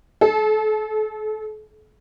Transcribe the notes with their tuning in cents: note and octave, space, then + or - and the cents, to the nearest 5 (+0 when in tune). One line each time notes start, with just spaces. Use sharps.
A4 -35